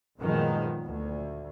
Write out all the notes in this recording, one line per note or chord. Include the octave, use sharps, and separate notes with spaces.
F#2 A#2 D#3 F3 G#3 B3
D2